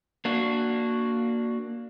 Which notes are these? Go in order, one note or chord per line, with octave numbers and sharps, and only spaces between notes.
A#3 D4 F#4